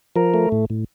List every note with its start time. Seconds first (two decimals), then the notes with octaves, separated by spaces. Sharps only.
0.16 F3 A#4
0.34 A3
0.52 A2
0.70 A2